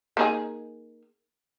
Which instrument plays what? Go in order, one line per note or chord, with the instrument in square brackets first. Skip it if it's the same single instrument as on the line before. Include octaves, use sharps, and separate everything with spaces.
[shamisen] A#3 D#4 G#4